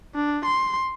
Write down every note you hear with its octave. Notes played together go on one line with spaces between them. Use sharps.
D4
C6